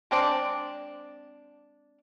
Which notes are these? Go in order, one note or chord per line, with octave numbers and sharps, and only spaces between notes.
G#3 C4 D4